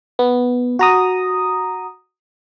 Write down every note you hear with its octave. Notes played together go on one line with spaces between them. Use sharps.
B3
F#4 A#5 D#6